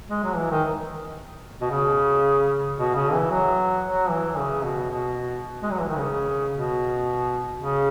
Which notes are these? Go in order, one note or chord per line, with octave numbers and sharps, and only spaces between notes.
G#3
F#3
E3
D#3
B2
C#3
B2
C#3
E3
F#3
F#3
E3
C#3
B2
B2
G#3
F#3
E3
D#3
C#3
B2
C#3